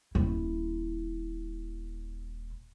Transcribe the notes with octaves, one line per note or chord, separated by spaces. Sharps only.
D#1 E4